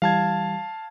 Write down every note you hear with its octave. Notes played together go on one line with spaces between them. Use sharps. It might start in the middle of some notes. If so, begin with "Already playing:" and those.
E3 G3 F5 A5 G#6